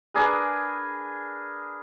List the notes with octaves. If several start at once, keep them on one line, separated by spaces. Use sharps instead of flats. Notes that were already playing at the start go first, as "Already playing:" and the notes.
D4 G#4 A#4 B4